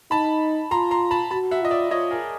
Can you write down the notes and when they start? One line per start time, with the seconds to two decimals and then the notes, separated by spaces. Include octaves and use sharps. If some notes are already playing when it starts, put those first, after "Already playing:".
0.11 D#4 A5 B5
0.71 F4 A#5 C6
0.91 A#5 C6
1.11 A5 B5
1.31 F#4 A5 B5
1.51 E5 F#5
1.61 F4 D#5
1.71 D5 E5
1.91 F4 C#5 D#5
2.11 G#4 A#4